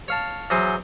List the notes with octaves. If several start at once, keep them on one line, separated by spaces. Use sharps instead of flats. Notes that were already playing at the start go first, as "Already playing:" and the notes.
C#5 F5 A5
E2 F#3 C5 G#5 C6